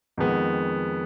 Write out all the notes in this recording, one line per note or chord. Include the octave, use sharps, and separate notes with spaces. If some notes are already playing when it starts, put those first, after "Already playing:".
F2 D#3 G#3 B3